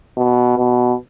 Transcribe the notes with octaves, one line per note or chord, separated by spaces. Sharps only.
B2
B2